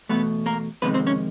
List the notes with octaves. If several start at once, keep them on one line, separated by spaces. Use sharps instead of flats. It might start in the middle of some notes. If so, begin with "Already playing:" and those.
E2 B2 F#3 A3 B3 B4
A#3 A#4
F2 C3 D#3 G#3 B3 B4
C4 C5
C#4 C#5